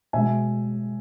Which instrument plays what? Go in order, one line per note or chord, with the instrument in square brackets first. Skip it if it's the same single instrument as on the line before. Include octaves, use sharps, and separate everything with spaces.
[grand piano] B2 G#3 E5 G#5